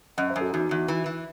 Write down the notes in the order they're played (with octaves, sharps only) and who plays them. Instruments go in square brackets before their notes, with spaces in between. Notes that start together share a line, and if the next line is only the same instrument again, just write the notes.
[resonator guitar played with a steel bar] F#2 [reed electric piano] D#5 F#5
[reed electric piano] C5 E5
[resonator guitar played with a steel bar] F#2
[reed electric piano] F#4 A4
[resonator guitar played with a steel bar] E2 [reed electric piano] D#4 F#4
[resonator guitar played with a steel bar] E2
E3
E3